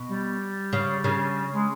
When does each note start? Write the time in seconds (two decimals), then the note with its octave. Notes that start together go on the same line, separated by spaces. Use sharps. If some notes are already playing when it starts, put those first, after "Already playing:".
Already playing: B2
0.08 G3
0.73 C#3
1.04 C#3
1.52 G#3